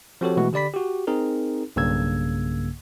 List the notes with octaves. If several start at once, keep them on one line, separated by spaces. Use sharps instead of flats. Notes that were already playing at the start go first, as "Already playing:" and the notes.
F3 C4 F#4 G4 A4 C#5
B2 E3 G#3 A3 F#4
D3 G4 D5 B5 B6
F#4 G4
C4 D#4 G#4 A#4
B1 G2 C#3 A#3 E6 G#6